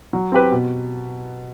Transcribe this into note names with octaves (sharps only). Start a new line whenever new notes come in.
F#3
C4 G4 B4
B2